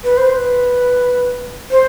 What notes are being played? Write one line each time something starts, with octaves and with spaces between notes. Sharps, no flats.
B4
C5
B4
C5